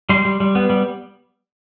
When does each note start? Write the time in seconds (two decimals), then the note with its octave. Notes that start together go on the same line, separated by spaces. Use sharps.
0.09 G3 C6
0.25 G3
0.40 G3
0.55 B3
0.70 G3